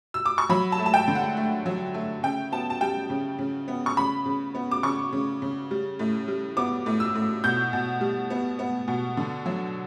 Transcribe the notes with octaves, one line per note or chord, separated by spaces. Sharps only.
E6
D6
C#6
F#3 B5
A5
A3
A5
G5
D3
F#5
A3
F#3
A3
C#3 G5
B3 A5
A5
G3 G5
C#3
C#3
B3
C#6
C#3 B5
C#3
B3
D6
C#3 C#6
C#3
C#3
G3
A2
G3
B3 D6
A2
E6
A2
B2 G6
B2
G3
B3
B3
B2
D3
F#3